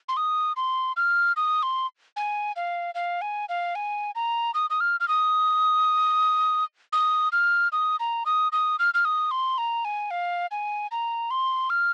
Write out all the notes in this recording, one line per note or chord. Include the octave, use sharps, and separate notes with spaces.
C6
D#6
C6
F6
D#6
C6
G#5
F5
F5
G#5
F5
G#5
A#5
D#6
D#6
F6
F6
D#6
D#6
F6
D#6
A#5
D#6
D#6
F6
F6
D#6
C6
A#5
G#5
F5
G#5
A#5
C6
F6